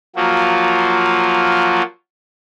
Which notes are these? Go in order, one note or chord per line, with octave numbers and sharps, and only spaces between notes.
F3 F#3 A#3 F4 F#4